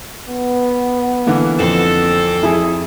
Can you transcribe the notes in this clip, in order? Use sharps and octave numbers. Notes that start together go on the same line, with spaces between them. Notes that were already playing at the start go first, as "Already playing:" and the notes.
B3
D3 E3 A#3
F2 C4 A4
F2 E4 G#4